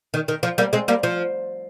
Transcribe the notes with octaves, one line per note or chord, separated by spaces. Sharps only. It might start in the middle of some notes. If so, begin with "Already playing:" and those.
D#3
D#3
F3
G3 A#3
G#3 C4
G3 A#3
F3